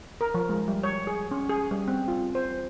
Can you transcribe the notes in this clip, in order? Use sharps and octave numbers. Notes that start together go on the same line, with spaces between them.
A#4
F3
G#3
G3
C#5
G#4
C#4
G#4
G3
C4
F4
C5